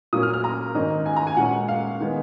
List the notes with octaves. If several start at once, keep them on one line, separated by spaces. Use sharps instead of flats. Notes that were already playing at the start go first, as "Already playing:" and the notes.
A#2 F#3 A#3 C#4 D#6
F6
F6
A#5
G#2 D#3 A#3 C#4 D#5
G#5
A#5
G#5
A#2 G#3 C#4 F#5
F5
D#3 G#3 B3